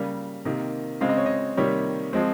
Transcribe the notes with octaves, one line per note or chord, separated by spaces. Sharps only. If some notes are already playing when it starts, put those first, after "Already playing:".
Already playing: C#3 G3 A#3 F5
C3 D#3 A#3
C#3 G#3 C4 F5
D#5
C#5
D#5
C3 D#3 G3 A#3 C#5
F3 G#3 C4